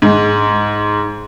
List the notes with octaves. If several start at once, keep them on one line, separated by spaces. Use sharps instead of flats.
G#2